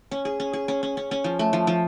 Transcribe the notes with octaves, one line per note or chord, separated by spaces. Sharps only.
C#4
G#4
C#4
G#4
C#4
C#4
C#4
C#4
F3
A3
F3
F3